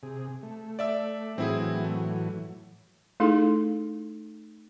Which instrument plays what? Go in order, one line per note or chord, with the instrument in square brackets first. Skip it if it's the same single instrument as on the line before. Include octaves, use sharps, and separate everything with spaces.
[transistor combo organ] C3 G#4
A3
[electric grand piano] D5 E5 E6
[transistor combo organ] A2 E3 F#3 [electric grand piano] C4 E4 G#4
[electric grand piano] A3
[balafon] A3 D#4 E4 G#4 A4